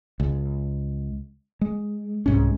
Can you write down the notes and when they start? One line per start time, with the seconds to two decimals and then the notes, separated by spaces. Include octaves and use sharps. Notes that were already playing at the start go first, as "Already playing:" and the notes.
0.20 C#2
1.61 G#3
2.26 C2 G#2 C#4